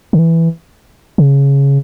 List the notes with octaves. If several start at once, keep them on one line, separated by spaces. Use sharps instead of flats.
D3
E3
C#3